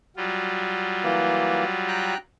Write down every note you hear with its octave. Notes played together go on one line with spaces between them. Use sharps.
F#3 G3 F4
E3 A#3
G5 A#5 F#6